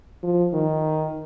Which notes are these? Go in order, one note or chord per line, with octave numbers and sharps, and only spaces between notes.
F3
D#3